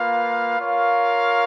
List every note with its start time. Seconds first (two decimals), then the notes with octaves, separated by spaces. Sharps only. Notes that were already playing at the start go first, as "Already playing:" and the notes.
Already playing: A#3 F4 B4 F5
0.58 F4 A#4 C#5 F5